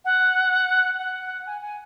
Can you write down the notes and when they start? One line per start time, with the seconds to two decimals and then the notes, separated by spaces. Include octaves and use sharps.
0.05 F#5
0.99 F#5
1.47 G#5
1.62 G#5